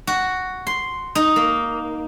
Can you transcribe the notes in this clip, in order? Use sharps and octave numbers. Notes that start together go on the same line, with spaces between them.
F#4
C6
D#4
A#3